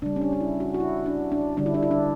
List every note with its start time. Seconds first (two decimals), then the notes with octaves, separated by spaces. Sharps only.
0.02 C#3 G3 D4
0.16 C#4
0.21 D4
0.33 D4
0.40 E4
0.60 F#4
0.74 F#4
0.80 E4
1.06 D4
1.32 D4
1.57 D3 G3 D4
1.66 E4
1.74 D4
1.83 E4
1.91 D4